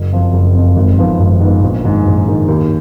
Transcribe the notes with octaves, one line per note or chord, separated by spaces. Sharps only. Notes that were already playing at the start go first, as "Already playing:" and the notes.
Already playing: F#1
F2 F3
F#1
F2 F3
G#1
G#2 F3 B3
G#1
G#2 F3 B3
A#1
G#2 D#3
A#1
G#2 D#3
D#2